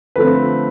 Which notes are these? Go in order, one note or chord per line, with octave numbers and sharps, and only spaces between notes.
D3 F3 A3 C4 B4